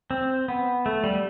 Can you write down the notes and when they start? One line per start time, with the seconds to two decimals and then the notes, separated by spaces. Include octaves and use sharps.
0.11 C4
0.48 B3
0.86 A3
1.04 G3